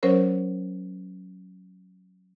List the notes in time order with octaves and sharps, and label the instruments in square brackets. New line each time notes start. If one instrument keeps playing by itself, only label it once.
[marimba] F#3 C#4 A#4 C5 C#5